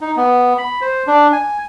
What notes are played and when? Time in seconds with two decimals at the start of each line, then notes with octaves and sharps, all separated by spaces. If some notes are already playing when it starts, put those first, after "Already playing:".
0.01 D#4
0.17 B3
0.58 B5
0.81 C5
1.07 D4
1.32 G#5